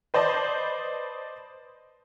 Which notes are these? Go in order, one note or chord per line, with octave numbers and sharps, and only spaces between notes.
B4 C5 D5 D#5 A5